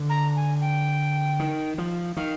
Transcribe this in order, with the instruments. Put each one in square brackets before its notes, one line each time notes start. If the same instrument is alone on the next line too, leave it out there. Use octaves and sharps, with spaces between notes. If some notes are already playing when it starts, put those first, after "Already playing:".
Already playing: [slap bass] D3
[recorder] A#5
G#5
G5
[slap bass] D#3
F3
[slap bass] D#3 [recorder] F5